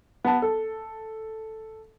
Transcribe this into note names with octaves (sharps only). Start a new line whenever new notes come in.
B3 A5
A4